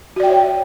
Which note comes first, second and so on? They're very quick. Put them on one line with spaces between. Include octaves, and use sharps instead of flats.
F#4 D5 G5 E5 C#5